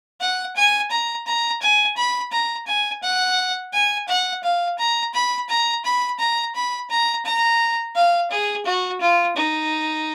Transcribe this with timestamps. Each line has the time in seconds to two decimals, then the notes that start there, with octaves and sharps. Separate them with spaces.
0.20 F#5
0.56 G#5
0.91 A#5
1.26 A#5
1.61 G#5
1.97 B5
2.32 A#5
2.67 G#5
3.02 F#5
3.73 G#5
4.08 F#5
4.43 F5
4.79 A#5
5.14 B5
5.49 A#5
5.84 B5
6.19 A#5
6.55 B5
6.90 A#5
7.25 A#5
7.95 F5
8.31 G#4
8.66 F#4
9.01 F4
9.37 D#4